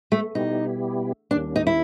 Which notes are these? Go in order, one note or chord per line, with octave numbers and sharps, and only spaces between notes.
A3
B2 G3 B3 D#4 E4 G4
D#2 D#3 G3 A#3 C#4 D4
D#4
E4